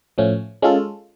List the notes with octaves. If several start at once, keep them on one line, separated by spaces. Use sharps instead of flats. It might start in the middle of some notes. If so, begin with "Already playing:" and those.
A2 F3 A3 C#4
G#3 C#4 F4 A4